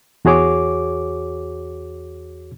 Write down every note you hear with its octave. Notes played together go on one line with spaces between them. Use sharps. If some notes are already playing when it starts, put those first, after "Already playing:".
E2 F#4 G#4 C#5 D6